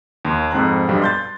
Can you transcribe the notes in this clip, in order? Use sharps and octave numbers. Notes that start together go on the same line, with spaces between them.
D#2 C6
F2 G#2 C4 A#5 F#6
B1 G2 G3
C6 G6 A6